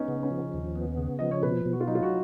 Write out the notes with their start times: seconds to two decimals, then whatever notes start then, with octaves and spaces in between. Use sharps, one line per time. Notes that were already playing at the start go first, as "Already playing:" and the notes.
Already playing: B3 C#4 D#4
0.08 C#3
0.23 C#4
0.31 F3
0.53 D#2
0.76 B3
0.98 C#3
1.19 F3 D#5
1.31 C#5
1.43 B2 B4
1.65 B2
1.73 F#4
1.80 F4
1.87 F#3 D#4
1.95 F4
2.03 F#4